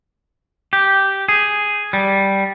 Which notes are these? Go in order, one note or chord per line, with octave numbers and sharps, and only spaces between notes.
G4
G#4
G3